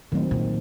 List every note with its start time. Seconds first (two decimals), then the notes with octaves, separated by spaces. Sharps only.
0.12 A2 D#3 F#3 C4 D#4
0.31 A#2